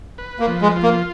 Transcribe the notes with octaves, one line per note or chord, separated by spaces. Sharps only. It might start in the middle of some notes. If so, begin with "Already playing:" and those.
B4
A#3
F3
G#3
F4
A#3